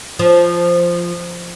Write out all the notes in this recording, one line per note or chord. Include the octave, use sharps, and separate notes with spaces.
F3